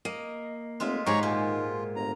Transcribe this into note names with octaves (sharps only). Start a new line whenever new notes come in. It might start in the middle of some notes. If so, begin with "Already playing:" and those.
A#3 D#5
F1 G#3 F4 E5
G#2 D#3 G#3 G4 C#5 A#5 C#6
A#2 F4
G1 A#5